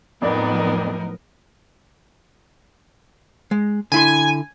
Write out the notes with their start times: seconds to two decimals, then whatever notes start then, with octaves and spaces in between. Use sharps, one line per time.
0.22 F2 A2 F3 F#3 B3 D#4 A#4 D5
3.51 G#3
3.92 D3 E4 G#5 C6